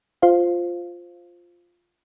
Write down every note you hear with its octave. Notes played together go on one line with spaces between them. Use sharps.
F4 C5 F5